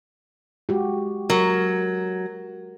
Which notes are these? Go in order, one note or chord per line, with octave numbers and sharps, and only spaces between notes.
G#3 F#4 G4
F#3 A#4